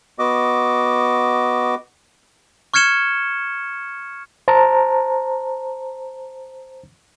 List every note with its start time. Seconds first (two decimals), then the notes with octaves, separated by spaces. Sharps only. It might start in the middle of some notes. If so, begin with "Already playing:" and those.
0.19 B3 F#4 D#5 D6
2.74 C#6 F6 G#6 C#7 E7 G7
4.48 C5 A5 A#5